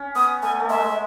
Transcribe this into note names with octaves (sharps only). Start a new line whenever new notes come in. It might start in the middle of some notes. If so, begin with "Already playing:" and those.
Already playing: C#4
B3 D#6
A3 G#5
A3
G#3 E5